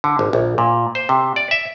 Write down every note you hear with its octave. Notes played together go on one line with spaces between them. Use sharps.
D3
G#1
A#1
A#2
C5
C3
D5
E5